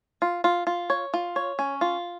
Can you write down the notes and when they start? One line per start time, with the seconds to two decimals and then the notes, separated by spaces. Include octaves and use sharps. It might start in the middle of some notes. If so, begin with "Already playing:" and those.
0.22 F4
0.44 F4
0.67 F4
0.90 C#5
1.14 F4
1.36 C#5
1.59 C#4
1.81 F4